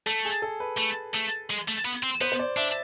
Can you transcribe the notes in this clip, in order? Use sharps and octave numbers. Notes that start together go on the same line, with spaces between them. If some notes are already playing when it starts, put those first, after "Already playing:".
A3 A4
G#4
A4
B4
A3
A3
G#3
A3
B3
C4
B3 C5
C5
D5
D4 E5